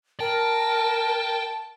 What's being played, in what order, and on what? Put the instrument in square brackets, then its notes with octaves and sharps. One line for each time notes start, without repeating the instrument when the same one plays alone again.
[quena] A#4 [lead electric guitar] G5 [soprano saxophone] A5